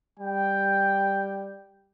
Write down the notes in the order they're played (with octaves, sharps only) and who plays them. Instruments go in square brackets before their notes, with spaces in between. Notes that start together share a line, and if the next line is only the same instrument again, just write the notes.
[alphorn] G3 [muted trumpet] G5